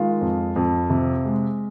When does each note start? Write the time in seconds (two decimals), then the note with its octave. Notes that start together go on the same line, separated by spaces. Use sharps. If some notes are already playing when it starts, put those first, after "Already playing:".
Already playing: D#3 G#3 F4
0.21 F2
0.56 F2
0.90 C3
1.25 G#3